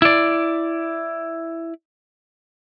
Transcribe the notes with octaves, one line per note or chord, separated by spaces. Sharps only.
E4 D5